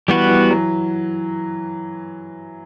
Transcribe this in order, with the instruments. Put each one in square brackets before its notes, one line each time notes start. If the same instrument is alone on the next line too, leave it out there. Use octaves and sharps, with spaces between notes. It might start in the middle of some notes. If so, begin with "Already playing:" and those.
[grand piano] E3 [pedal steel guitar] G3 B3 F#4 B4
[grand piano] E3
F#3